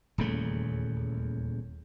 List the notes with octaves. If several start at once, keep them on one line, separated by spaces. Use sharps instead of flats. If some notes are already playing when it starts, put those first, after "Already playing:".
D#1 E2 C#3 A3